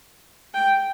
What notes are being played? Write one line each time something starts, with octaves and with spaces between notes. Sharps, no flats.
G5